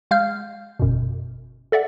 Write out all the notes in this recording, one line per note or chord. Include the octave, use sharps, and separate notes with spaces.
G#3 F5 F6 G6
G1 F#2 B2
A4 D5 E5 F#5